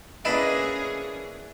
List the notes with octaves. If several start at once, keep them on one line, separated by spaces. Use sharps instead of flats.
A#3 C#4 D4 E4 G#4 B4 D#5